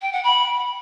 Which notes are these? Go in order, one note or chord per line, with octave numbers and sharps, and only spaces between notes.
G5
F#5
B5